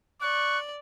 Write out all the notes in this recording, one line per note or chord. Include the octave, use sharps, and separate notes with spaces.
D5 C#6 F#6